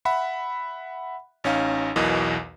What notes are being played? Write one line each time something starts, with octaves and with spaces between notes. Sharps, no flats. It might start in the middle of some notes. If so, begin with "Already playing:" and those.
E5 F#5 B5
A1 C#4 D#4 F5
B1 E2 B2 E3 A#4 D#5